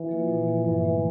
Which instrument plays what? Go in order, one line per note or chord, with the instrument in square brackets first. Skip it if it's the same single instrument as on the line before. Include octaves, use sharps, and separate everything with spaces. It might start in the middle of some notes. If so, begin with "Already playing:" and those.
Already playing: [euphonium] E3
[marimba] F3 A#3 F4
A#2
F3 A#3 F4
[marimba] G2 [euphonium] E3
[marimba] D3 A3